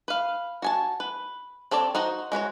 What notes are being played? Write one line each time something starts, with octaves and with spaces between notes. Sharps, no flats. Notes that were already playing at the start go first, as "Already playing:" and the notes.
B4 F5
F#4 G#5 A5
B4
C4 A4 C#5 D5
D#4 F#4 C5
G#3 F#4 B4 C#5